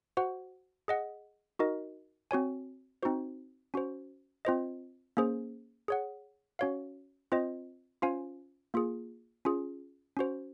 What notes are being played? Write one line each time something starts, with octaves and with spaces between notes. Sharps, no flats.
F#4 C5 F#5
G#4 D#5 F#5
D#4 F#4 A#4 D#5
C4 F#4 C#5 G#5
C4 D#4 F#4 C5
C#4 F#4 C5
C4 F4 C5 D#5
A#3 C#4 G#4 C5
G#4 C#5 F#5
C#4 F#4 C#5 F5
C4 F4 C5 D#5
C#4 F4 C5 F5 G#5
A#3 F4 G#4
C#4 F4 G#4
C#4 F#4 C5